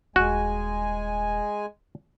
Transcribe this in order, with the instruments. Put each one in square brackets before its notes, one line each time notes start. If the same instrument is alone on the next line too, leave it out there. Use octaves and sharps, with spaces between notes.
[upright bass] D#1 F4 [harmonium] G#3 G#5 [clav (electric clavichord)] F#4